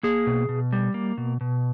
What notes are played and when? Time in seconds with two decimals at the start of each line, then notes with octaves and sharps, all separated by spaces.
0.03 A#3 G#4
0.27 B2
0.49 B2
0.72 G3
0.94 A#3
1.18 B2
1.41 B2